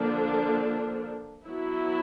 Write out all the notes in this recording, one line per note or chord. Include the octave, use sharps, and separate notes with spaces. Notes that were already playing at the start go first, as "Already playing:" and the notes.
Already playing: D3 F3 A#3 D4
F#3 B3 E4